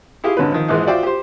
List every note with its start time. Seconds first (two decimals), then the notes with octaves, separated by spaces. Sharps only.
0.24 E4 F4 G4 G#4 F5
0.37 G#1 D3 C#4 B4
0.52 D#3 F3
0.68 A#1 G#2 E3 G#3
0.87 F4 F#4 C5 D5 E5 G5
1.03 G4 C5